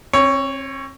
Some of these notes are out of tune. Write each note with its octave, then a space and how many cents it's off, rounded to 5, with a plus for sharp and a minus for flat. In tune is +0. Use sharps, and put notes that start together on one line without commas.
C4 +40 C#5 +5